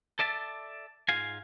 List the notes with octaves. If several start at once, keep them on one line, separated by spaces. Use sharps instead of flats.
A4 D5 E5 A5
G#2 G#3 F4 F5 G#5